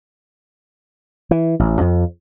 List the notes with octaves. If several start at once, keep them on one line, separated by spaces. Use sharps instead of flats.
E3
A1
F2